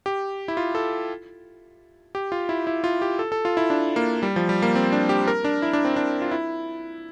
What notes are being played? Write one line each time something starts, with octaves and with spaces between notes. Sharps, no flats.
G4
E4
F4
A4
G4
F4
E4
E4
F4
G4
A4
A4
F4
E4
D4
A#3
G3
F3
G3
A#3
C4
D4
G4
A#4
D4
E4
D4
C4
D4
F4
E4